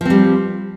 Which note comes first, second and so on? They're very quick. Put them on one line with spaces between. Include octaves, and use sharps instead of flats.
F3 C4 G3